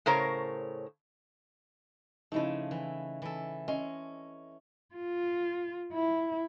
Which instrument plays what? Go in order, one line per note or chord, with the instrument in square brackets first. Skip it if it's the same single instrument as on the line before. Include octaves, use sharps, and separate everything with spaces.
[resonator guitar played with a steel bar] A2 C#3 A#4 C5 C#5
[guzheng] C#3 F3 A3 [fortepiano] D#4 E4
[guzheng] E3
E3 A4
[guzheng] C#4 C6 [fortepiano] D#5
[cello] F4
E4